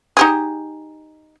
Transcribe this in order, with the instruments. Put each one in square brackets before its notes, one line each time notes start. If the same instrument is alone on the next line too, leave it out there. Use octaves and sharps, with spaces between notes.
[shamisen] D#4 G4 G#4